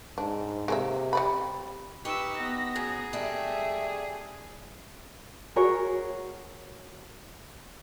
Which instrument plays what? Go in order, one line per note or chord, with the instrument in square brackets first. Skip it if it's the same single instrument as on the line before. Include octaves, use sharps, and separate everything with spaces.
[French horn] G#2 [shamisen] D4
[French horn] C3 [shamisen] G#3 A#3 E5
[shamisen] G3 D5 B5
[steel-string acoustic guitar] D#4 G4 [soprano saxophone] B4 [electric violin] C#6 E6
[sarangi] B3 [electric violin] A#6
[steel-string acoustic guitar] F#2 [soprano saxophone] G#4
[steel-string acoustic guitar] G3 D4 [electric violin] A3 [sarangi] E5
[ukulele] F#4 G#4 A#4 C#5